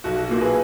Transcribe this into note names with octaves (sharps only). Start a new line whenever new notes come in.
B1 F#4
F#4
A#2 A#3 E4
G#4 B4